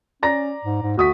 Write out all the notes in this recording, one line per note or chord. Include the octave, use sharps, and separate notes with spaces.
C#4 D5 A#5 A#6
G#2
G#2
D2 F#4 D#6 B6